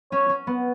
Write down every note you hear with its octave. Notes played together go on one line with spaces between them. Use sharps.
C#4 C#5
C#4
B3